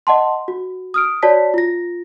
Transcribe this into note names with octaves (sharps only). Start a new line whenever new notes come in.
D#5 F#5 A5 C6
F#4
D#6 F6 D7
F#4 C#5 D5 A5 B6
F4 A#6